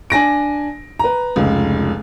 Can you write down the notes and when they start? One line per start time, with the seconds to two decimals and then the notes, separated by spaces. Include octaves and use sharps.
0.10 D4 G#5 A#6 D7
0.99 B4 A#5
1.36 F1 C#2